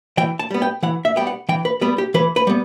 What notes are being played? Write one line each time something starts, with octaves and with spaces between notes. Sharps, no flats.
E3 G5
A5
G3 B3
G5
E3 F#5
E5
G3 B3 G5
F#5
E3 G5
B4
G3 B3 B4
G4
E3 B4
B4
G3 B3